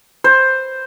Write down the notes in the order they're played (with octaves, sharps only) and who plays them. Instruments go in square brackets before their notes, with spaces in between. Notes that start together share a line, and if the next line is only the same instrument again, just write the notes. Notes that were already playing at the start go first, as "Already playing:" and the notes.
[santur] C5